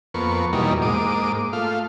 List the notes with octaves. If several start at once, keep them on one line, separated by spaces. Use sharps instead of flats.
F2 A#3 B3 C#6
E2 B2 F#3 G3 A#3 D#4
G#2 A#3 D6 D#6
A3 F4 F5